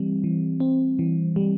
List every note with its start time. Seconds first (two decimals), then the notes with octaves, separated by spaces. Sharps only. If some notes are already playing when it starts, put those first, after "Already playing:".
Already playing: E3 G3 C4
0.24 E3
0.60 C4
0.99 E3
1.36 G3